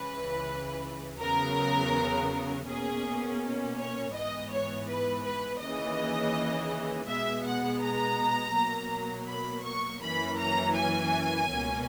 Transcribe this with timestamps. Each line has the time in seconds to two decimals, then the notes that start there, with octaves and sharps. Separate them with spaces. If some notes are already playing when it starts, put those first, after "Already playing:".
Already playing: C#2 C#3 E3 B4
1.20 E2 C#3 F#3 B3 A#4
2.67 B2 A#3 C#4 G#4
3.77 C#5
4.14 G#2 E3 B3 D#5
4.50 C#5
4.88 B4
5.24 B4
5.61 D#2 C#3 E3 D#5
7.08 B2 G#3 B3 E5
7.44 F#5
7.81 A#5
8.54 B2 F#3 A#3
9.28 B5
9.65 C#6
10.02 F#2 E3 A#3 C#4 B5
10.39 A#5
10.76 G#5
11.49 C#2 B2 A#3 C#4